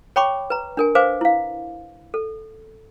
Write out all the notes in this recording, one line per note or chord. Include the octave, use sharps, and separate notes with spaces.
C#5 G5 B5 C#6 D6
B4 A#5
D4 A#4 G#5
B4 C5 F5 G#5 D6
E4 F5
A4